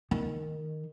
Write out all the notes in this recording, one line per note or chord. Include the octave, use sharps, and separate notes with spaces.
D#3